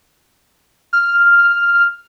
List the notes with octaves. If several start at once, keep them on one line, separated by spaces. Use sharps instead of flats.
F6